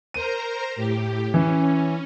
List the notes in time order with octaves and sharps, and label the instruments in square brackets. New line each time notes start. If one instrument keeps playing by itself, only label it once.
[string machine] A#4 C5 A#5 [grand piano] D#7
[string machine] A2 G4
[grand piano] E3 [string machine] C#4